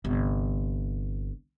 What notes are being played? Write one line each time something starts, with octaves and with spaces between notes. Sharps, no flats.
G1 C3